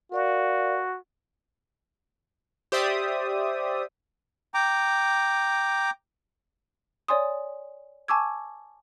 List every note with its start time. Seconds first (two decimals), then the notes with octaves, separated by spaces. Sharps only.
0.12 F#4 A#4 D5 F5
2.72 G4 C5 D5 E5 D#6
4.54 G5 A#5 D6
7.08 C#5 D5 G#5 C6 D#6
8.08 G#5 A5 C#6 D6 E6 G#6